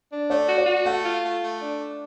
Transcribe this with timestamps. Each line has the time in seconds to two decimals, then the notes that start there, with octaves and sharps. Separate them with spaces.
0.11 D4
0.30 A3 D5
0.48 F#4
0.58 D5
0.66 F#4
0.86 A3 F#5
1.04 F4
1.22 A3
1.41 A3
1.60 D4
1.79 D4